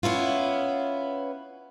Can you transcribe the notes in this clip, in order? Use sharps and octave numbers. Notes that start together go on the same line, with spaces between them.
B3 C#4 E4 F4